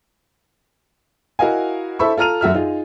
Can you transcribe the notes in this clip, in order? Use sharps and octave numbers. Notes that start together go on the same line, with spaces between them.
E4 F#4 A#4 D#5 F5 G#5
E4 A4 C5 E5 B5 C#6
F4 A4 A#5 F6 D#7 F7
F#2 F#4 E5 F6
D#4 F4 G#4